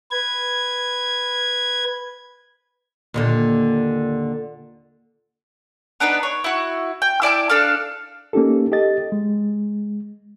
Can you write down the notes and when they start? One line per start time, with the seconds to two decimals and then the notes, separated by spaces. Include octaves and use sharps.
0.11 B4 G#6
3.14 D#2 A#2 D3
6.00 B3 D4 D#4 B4
6.23 C#5
6.44 E4 F#4
7.02 G5
7.22 E4 D5 A5 D6
7.49 D4 A4 F5
8.33 A#3 C#4 D#4 G4 A4
8.72 G4 A4 D#5 A6
9.12 G#3